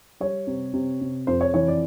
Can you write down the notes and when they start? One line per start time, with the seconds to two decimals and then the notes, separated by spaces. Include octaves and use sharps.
0.20 G3 C#5
0.47 C3
0.74 C3
1.01 C3
1.27 F2 C5
1.41 C#5
1.54 E3 C#5
1.68 D5